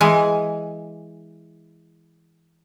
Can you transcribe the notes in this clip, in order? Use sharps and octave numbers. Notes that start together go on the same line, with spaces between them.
E3 G#3